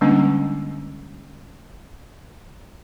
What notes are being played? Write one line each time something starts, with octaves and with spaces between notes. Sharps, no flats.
D3 G3 G#3 A#3 C#4 D4